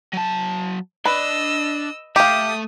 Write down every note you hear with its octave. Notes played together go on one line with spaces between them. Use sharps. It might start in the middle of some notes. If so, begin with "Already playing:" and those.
F#3 A5
D4 B4 D#5 E6
A3 G4 E5 F5 D#6